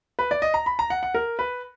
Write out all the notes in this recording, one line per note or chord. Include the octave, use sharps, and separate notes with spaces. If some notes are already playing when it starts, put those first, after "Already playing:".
B4
D5
D#5
A#5
B5
A#5
F#5
F#5
A#4
B4